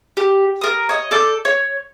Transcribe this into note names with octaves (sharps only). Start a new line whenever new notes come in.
G4
A#4 D#6
C#5 D#5
A4 D5 G6
C#5